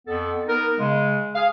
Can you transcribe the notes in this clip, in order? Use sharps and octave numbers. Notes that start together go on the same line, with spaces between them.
F2 B3 A4
B3 D#4 A#4
C#3 G#3
G#4 F5